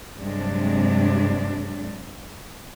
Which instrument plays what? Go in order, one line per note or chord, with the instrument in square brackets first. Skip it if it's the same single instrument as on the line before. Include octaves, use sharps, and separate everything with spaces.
[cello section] G2 C3 F#3 G#3 D4